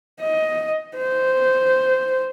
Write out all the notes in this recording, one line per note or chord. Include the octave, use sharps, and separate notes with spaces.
D#5
C5